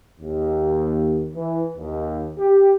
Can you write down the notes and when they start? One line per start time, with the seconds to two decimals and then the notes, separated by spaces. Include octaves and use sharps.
0.20 D#2
1.34 E3
1.77 D#2
2.38 G4